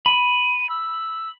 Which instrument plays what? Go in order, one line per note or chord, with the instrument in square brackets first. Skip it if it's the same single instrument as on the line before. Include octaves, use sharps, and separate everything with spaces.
[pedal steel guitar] B5 [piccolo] D#7
[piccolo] E6